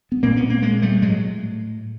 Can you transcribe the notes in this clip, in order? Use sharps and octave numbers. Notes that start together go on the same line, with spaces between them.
B3
A#2 A#3 C4
B3 C#4
A#3 C4
G#3 A#3
G3 A3
A2 F#3 G#3